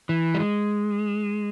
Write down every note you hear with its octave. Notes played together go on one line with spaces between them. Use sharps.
E3
G3
G#3